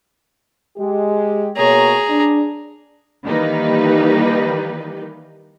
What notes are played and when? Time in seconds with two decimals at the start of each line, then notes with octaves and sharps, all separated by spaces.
0.77 G#3 G4
1.56 B2 A#3 G#4 C#5 A#5
2.10 D4
3.23 D#3 E3 G3 A#3 D#4 B4